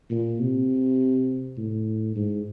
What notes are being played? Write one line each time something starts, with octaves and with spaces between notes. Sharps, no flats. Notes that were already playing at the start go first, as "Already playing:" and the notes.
A#2
C3
A2
G#2